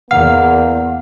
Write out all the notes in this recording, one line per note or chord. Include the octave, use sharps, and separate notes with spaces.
E2 A#3 F5 F#5